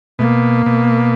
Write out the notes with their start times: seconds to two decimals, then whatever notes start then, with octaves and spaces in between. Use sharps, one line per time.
0.19 B2 A#3
0.66 B2